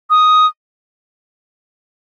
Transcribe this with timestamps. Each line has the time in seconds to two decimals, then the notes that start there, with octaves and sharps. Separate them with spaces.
0.10 D#6